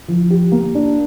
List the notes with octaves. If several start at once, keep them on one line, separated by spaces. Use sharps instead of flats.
F3
G4
A#3
D4